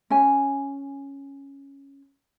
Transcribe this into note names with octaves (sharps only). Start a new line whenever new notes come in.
C#4 G#5